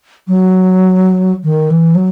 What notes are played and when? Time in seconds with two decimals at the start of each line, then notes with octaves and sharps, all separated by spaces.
0.28 F#3
1.44 D#3
1.70 E3
1.95 F#3